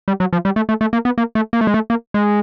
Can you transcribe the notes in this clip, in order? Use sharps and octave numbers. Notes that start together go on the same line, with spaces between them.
G3
F#3
F3
G3
A3
A3
A3
A#3
B3
A#3
A3
A#3
A3
G#3
A3
A#3
G#3